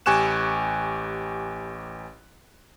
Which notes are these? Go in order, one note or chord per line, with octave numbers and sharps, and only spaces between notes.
A1 G4 G#5 C#6 F#6 E7